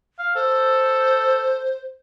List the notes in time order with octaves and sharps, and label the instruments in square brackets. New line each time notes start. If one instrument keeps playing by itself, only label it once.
[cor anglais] F5
[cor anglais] A4 [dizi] C5